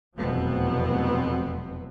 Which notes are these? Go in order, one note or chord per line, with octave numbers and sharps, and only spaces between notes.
F1 E2 B2 F#3 B3 C4